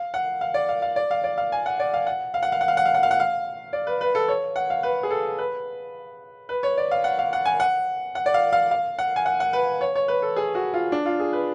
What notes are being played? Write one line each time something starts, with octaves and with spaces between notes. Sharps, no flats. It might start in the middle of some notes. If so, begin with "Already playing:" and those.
Already playing: F5
F#5
F5
D5
F5
F5
D5
F5
D5
F5
G#5
F#5
D5
F5
F#5
F5
F#5
F5
F#5
F5
F#5
F5
F#5
F5
F#5
F5
D5
B4
B4
A4
C#5
F#5
F5
B4
G#4
A4
B4
B4
C#5
D5
F5
F#5
F5
F#5
G#5
F#5
F#5
D5
F5
F5
F5
F#5
G#5
F#5
F#5
B4
C#5
C#5
B4
A4
G#4
F#4
F4
D4
F4
G#4
B4